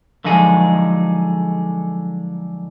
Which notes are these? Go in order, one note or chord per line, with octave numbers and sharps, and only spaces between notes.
D3 F3 F#3 G#3 D#4 G#4